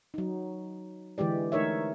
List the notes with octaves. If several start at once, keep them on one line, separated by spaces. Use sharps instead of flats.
F#3 D#4
D3 E3 G#3 G4 D5
A3 D#4 A#4 C#5 E5